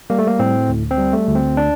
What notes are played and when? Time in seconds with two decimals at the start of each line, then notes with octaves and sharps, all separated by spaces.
0.10 G3 A#3
0.19 A3
0.27 A#3
0.39 A2 C4
0.69 D2
0.91 C4
0.98 G3
1.13 A3
1.27 D2
1.35 C4
1.57 D4